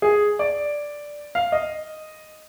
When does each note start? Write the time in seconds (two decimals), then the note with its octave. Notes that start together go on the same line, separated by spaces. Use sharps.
0.02 G#4
0.39 D5
1.35 F5
1.52 D#5